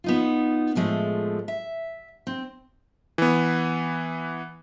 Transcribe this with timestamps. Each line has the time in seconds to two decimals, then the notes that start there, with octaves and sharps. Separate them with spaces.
0.04 B3 D#4 F4
0.75 A2 F3 G#3 A3
1.48 E5
2.27 C4
3.18 E3 B3